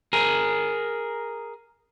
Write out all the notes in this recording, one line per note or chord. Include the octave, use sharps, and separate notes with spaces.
G#4 A#4